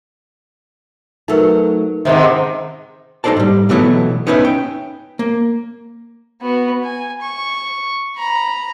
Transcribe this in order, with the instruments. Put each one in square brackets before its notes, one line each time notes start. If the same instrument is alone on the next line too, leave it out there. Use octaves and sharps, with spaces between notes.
[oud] F#3 A3 [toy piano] D#4 A#4 B4
[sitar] G#2 C3 D#3 [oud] C4 C#4 G#4 [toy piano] E5
[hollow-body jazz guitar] B1 D#4 A4 C5 D5 A5
G#2 G3
B2 E3 F#3 A3 B3 E4
B3 C#4 D#4 B4 E5
G5
A#3
[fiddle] B3 F#4
G#5
C#6
A#5 B5